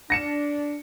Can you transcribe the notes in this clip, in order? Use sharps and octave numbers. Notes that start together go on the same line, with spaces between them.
D4 A#6 C#7 E7